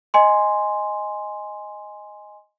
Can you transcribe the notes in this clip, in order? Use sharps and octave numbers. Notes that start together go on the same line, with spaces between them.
D#5 G#5 C6